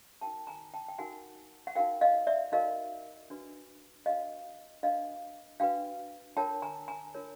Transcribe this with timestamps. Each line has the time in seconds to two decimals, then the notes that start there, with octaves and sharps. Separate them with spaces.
0.21 D#4 F#4 A#4 G5 A5
0.47 G#5 A#5
0.74 G5 A5
0.88 G5
0.98 D#4 F#4 A#4 F#5 G#5
1.67 F#5
1.75 D#4 F#4 A#4 F5 G5
2.01 D#5 F5
2.27 D5 E5
2.52 D#4 F#4 A#4 D#5 F5
3.30 D4 F#4 B4
4.06 D4 F#4 B4 D#5 F5
4.83 D4 F#4 B4 D#5 F5
5.60 D4 F#4 B4 F5 G5
6.37 D4 F4 A#4 C#5 G5 A5
6.62 G#5 A#5
6.88 G#5 A#5
7.14 D4 F4 A#4 C#5